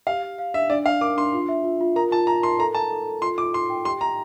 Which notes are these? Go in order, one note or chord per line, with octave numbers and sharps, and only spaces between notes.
G4 F5
F5
F5
D4 E5
D4 D5
D4 F5
A#4 D6
D4 C6
F4
E5
F4
F4
A#4 A#5
F4 A5
A5 A#5
A#4 C6
A4 A#5
A5 A#5
A4
A4
F4 C6
F4 D6
F4 C6
G5
G4 C6
G4 A#5